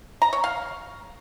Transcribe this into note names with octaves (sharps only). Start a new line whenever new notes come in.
A#5
C#5
F5